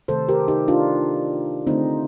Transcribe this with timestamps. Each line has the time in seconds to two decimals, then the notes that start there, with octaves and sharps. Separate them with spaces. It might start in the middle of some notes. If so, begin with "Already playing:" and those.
0.08 C3 D#3 A3 A4 C5
0.28 G4 A#4
0.48 D#4 G4
0.68 D4 F4
1.67 D3 A3 C4 D#4